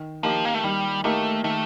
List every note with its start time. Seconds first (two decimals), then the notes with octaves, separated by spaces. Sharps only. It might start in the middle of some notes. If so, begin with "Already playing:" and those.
Already playing: D#3
0.23 F3 A#3 D#4 G4
0.45 A#3
0.54 A3
0.64 D#3 G3
1.04 A3 A#3 D#4 G4
1.44 D#3 A3